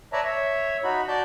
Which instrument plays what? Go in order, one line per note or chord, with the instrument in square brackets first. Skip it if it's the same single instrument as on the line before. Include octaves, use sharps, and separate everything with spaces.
[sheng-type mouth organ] B4 C#5 D5 E5 A5 A#5
C#5 E5
D#4 F#4 B5
F#4 D5 A5 G6